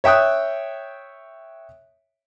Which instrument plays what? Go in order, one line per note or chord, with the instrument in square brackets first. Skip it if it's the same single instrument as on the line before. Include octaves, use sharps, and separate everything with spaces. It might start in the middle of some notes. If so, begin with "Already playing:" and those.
[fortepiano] C#5 E5 G5 D#6 F#6